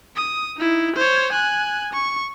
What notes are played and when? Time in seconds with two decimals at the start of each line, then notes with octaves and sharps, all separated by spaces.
0.15 D#6
0.57 D#4 E4
0.96 C5 C#5
1.33 G#5 F#6
1.93 C#6